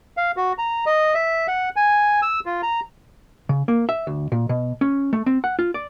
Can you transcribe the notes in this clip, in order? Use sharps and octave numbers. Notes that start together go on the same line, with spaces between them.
F5
F#4
A#5
D#5
E5
F#5
G#5
E6
F4
A#5
C#3
A#3
E5
D2
A#2
B2
C#4
A3
C4
F#5
F4
D5